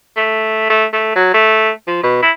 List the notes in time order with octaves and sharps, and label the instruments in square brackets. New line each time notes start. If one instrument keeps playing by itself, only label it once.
[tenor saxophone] A3
A3
A3
F#3
A3
F3
B2
E4